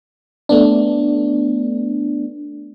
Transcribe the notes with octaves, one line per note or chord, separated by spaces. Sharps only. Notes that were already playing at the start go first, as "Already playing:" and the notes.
A3 B3 D4